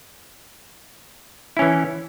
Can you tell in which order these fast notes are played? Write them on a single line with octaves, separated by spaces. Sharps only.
E4 C#4 E3